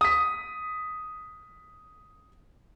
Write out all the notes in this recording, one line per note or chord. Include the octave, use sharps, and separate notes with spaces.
D#6 B6